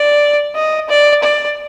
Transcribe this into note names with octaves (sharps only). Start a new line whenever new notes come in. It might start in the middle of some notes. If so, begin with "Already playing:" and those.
Already playing: D5
D#5
D5
D5